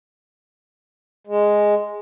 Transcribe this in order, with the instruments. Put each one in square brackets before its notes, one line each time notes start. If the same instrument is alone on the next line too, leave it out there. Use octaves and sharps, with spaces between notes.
[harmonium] G#3